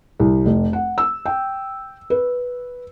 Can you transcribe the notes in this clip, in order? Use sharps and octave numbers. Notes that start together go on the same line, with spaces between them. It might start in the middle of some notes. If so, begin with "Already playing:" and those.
C2
F1
F#5
E6
G5
B4